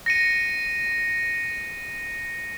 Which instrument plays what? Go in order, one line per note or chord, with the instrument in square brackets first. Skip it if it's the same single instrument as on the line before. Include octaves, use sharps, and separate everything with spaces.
[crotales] A#6 C#7 D#7